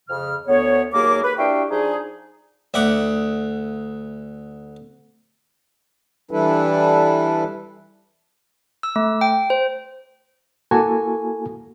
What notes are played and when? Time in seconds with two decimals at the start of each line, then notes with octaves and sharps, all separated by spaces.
0.09 F2 C#3 F6
0.47 D2 B3 C#5
0.92 D#2 F#3 A#3 G#4 A#4 D6
1.23 B4
1.38 D4 E4 F#4 G4 F5 G5
1.70 F3 D4 D#4 G#4
2.74 D2 E5 F#5 D6
6.31 E3 G3 D4 E4 A4 B4
8.83 E6
8.96 A3
9.21 G5
9.50 C5
10.71 A#3 E4 F#4 A4 G#5 A5